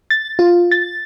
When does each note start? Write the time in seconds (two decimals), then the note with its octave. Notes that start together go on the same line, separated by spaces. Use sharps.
0.11 A6
0.39 F4
0.71 A6